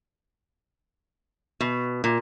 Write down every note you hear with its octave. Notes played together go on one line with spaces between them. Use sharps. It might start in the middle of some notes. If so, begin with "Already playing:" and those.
B2
A#2